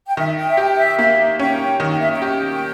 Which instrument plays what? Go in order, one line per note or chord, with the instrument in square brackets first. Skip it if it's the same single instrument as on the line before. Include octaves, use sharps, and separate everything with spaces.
[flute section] G5
[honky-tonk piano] D#3 [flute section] E5
[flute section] G5
E5
[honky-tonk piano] G4 [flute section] G5
[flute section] E5
[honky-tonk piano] A#3 [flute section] E5
[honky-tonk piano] C#4 [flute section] G5
[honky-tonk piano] D#3
[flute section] G5
E5
G5
[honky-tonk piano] G4